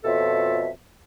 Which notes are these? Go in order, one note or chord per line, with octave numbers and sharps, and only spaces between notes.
F2 B2 F4 A4 C#5 E5